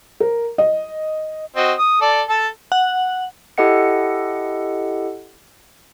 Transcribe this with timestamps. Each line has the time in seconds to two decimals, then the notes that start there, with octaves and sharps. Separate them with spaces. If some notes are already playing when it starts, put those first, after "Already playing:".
0.20 A#4
0.58 D#5
1.56 C4 F#4 D#5
1.79 D#6
2.01 A4 D5
2.29 A4 A5
2.72 F#5
3.58 E4 G4 A4 D#5 F#5 C#7